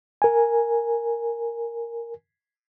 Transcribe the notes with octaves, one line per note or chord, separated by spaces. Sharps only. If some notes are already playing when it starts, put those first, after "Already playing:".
A#4 G#5